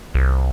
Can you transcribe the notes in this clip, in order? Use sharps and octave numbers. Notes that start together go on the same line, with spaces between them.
C2